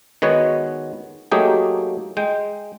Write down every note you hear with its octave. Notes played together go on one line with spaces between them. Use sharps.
D#3 G#3 B3 F#4 C#5
F#3 A3 A#3 D#4 G4 G#4
G#3 G5